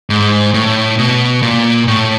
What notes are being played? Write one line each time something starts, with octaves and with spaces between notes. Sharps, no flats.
G#2
A2
B2
A#2
A2